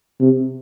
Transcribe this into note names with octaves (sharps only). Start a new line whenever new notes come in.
C3